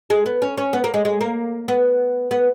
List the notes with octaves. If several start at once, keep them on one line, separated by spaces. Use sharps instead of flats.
G#3
B3
C#4
C#4
B3
A#3
G#3
G#3
A#3
B3
B3